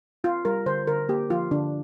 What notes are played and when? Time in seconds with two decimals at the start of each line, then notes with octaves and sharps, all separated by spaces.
0.24 C4 F4
0.45 G3 A#4
0.66 D3 C5
0.87 D3 A#4
1.09 A#3 G4
1.30 F3 F4
1.51 D3 D4